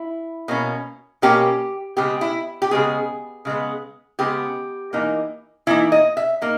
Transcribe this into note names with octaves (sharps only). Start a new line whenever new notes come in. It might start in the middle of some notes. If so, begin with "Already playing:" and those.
Already playing: E4
B2 A#3 C#4
B2 A#3 C#4 G4
C#3 G#3 B3 G4
E4
G4
C#3 G#3 B3 G#4
C#3 G#3 B3
C#3 G#3 B3 G4
E3 A#3 D#4
E3 A#3 D#4 E4
D#5
E5
A#3 D#4